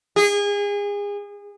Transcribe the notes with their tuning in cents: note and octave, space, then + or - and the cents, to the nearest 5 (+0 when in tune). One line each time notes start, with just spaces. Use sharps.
G#4 -30